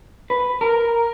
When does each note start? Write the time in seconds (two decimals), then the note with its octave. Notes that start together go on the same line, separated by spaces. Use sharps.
0.30 B4
0.61 A#4